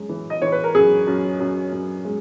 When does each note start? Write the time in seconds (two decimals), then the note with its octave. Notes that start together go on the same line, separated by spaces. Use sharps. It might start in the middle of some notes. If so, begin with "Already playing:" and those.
Already playing: F#2 G#3
0.09 E3
0.30 D#5
0.42 E3 C#5
0.52 B4
0.64 A#4
0.75 F#2 G#4
1.07 F#2
1.40 F#2
1.73 F#2
2.05 G#3